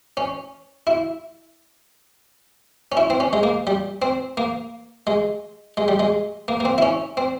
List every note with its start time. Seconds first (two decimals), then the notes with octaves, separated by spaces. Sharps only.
0.17 C#4
0.87 E4
2.92 C#4
2.97 E4
3.10 C4
3.20 C#4
3.33 G#3
3.43 A#3
3.67 G3
4.02 C4
4.37 A#3
5.07 G#3
5.77 G#3
5.88 G3
5.99 G#3
6.48 A#3
6.60 A#3
6.65 C4
6.78 E4
6.82 C#4
7.17 C4